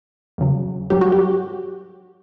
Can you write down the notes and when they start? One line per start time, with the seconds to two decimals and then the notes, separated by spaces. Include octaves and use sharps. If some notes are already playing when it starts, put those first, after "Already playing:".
0.38 E2 C#3 F#3
0.90 G2 F#3 G4
1.01 F#4
1.12 G4